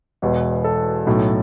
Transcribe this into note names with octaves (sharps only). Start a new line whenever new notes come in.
E1 E2 B2
A4
B1 A2 F#3